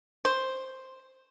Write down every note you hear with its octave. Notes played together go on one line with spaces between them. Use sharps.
C5